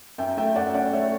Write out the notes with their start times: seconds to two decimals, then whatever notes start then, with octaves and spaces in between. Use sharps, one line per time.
0.18 F#2 E5 G5
0.37 A3 E5 G5
0.55 F#2 D5 F#5
0.74 C#4 D5 F#5
0.93 A3 C#5 E5